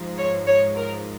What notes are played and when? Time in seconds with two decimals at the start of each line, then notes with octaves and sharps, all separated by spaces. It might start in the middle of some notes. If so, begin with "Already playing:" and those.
Already playing: G#2 F3
0.17 C#5
0.47 C#5
0.76 A#4